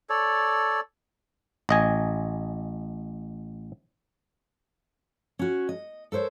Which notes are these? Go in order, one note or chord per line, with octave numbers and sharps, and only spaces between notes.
A4 C#5 D5
A1 D#5 G#5
C#4 F#4
D#5
A4 A#4 C5 C#5